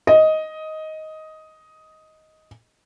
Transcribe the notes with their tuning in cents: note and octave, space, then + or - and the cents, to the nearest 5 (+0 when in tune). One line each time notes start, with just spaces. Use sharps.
D#5 +10